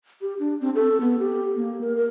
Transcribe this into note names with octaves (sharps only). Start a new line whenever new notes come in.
G4
D4
C4
A4
B3
G4
A#3
A#4
A#4